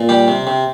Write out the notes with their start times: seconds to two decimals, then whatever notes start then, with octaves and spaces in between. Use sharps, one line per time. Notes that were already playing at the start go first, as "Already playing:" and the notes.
Already playing: A#2
0.09 G3 G4
0.28 C3
0.47 C3